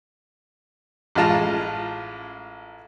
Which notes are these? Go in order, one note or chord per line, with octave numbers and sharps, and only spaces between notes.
A1 G#3 F4 A5 A#5